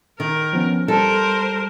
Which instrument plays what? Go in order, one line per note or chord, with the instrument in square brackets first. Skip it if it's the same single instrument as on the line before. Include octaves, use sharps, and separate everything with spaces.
[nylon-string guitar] D#3 [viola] A#4
[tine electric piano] F3 B3 C#4
[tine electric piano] G3 [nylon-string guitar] A4 [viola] A#4 C5